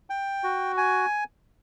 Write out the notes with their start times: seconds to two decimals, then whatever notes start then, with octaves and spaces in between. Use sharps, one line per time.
0.10 G5
0.44 F#4
0.77 G#5